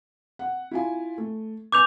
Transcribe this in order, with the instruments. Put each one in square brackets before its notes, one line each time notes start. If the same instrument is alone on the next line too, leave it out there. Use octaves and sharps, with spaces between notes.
[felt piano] F#5
E4 F4 G#5
A3
[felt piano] B4 G#5 [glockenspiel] D6 G6 F7